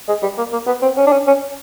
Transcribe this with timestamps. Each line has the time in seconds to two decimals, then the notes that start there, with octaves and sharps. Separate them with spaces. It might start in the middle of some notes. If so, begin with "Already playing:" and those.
0.08 G#3
0.22 G3
0.38 A#3
0.52 A#3
0.67 B3
0.82 C4
0.97 C#4
1.07 D4
1.12 C#4
1.27 C#4